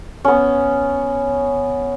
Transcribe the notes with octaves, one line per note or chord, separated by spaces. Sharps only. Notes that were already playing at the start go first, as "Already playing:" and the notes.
B3 C#4